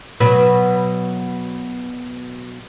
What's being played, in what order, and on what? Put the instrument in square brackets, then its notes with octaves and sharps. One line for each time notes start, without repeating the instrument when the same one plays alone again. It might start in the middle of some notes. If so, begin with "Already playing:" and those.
[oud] B2 F#3 B4